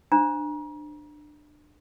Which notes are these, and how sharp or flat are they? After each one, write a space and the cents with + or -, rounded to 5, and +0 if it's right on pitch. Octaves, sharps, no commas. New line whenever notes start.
D4 +25 C5 +0 A#5 +30